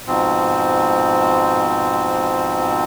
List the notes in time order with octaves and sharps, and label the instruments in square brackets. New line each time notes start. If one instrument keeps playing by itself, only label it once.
[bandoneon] G#2 B2 F3 C4